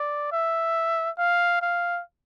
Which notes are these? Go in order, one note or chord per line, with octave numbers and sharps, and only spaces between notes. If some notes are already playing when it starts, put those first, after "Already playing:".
Already playing: D5
E5
F5
F5